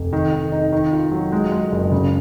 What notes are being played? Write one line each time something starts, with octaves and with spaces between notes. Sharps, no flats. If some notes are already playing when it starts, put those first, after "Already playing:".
Already playing: F1
D#3
D#3
D#4
D#3
F4
F#3
G#3
G#3
F#1
C#3